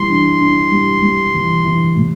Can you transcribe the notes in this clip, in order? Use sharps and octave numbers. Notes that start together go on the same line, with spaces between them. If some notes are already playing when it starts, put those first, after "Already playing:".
Already playing: E3 G3 C6
D4
D4
G3
G3
E3
E3
A2